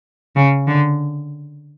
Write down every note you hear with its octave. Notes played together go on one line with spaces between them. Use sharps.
C#3
D3